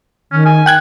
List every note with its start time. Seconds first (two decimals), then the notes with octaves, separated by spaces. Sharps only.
0.32 D#3 C#4
0.46 G#5
0.66 G5 F#6 G#6